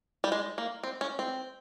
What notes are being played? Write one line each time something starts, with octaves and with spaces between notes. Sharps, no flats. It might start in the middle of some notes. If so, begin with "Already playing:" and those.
G3
G#3
A#3
C4
C#4
C4